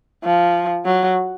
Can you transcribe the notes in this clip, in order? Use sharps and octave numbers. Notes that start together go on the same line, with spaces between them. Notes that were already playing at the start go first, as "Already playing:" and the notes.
F3
F#3